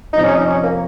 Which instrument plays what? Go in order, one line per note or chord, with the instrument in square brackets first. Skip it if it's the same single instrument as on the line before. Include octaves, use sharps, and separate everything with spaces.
[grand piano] F2 C3 F3 C4 F4 [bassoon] D#4
[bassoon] C#4
D#4
C#4
A#3